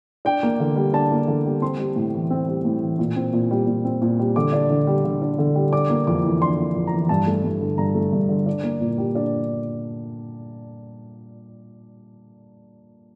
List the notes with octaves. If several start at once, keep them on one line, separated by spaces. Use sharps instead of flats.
D4 G5
A#3
D3
G3
D4 A5
A#3
D3
G3
C4 C6
G3
A2
E3
C4
G3
A2
E3
A#2
C4
A#2
G3
A#2
C4
A#2
G3
D3 D6
D4
D3
G3
D3
D4
D3
G3
D4 D6
A#3
F2 D6
E3
D4 C6
A#3
F2
A#5
E3
G2 A5
A3
G2
D3
G2 A#5
A3
G2
D3
D4
A#3
A#2
G3
D4